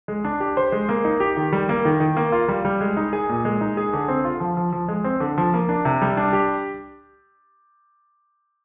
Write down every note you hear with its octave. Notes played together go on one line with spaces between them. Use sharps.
G#3
D4
G4
C5
G#3
A#3
D#4
G4
D#3
G3
A#3
D#3
D#3
A#3
F4
G3
G3
G#3
D#4
G#4
A#2
G#3
D#4
G#4
D3
C4
F4
F3
F3
F3
G#3
C4
D3
F3
A#3
D4
C3
G3
D4
G4